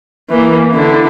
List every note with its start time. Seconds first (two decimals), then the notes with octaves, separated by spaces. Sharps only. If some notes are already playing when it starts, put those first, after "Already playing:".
0.29 E3 A#3
0.71 D3 E4